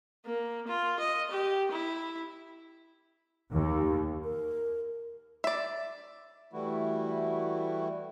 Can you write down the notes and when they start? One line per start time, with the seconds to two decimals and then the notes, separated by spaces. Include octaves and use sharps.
0.25 A#3
0.67 F4
0.99 D#5
1.31 G4
1.71 E4
3.54 D#2
4.24 A#4
5.44 D5 E5
6.53 E3 G3 A3 E4 F#4